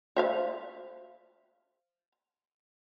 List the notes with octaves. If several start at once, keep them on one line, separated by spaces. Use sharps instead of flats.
C5 E5 F5